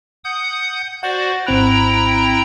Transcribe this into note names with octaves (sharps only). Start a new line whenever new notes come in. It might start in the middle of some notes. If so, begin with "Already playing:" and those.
F#5 D#6 G6
F#4 C5 D5 F#5
G#1 C4 E4 G5 A#5 F#6